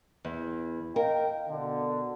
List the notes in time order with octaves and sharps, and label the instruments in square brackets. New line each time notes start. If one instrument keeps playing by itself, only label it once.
[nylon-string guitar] E2
[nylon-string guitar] A#4 [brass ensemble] D#5 F5 G5
[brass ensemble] B2 D3